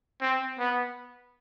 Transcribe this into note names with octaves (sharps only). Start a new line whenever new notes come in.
C4
B3